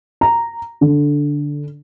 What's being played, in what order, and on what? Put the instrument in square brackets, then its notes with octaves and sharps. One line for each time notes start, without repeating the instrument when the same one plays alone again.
[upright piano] A#5
D3